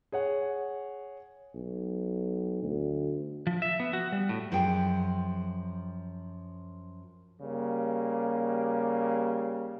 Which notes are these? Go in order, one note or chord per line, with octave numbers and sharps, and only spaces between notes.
G#4 C#5 F#5
B1
D2
F3
E5
B3
F#4
G3
A2
F#2 F3 G#4 G5
C#3 G3 A#3